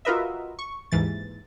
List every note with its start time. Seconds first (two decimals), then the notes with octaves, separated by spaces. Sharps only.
0.05 F4 F#4 A#4 B4 D#5 E5
0.59 C#6
0.92 D#2 G#2 E3 A6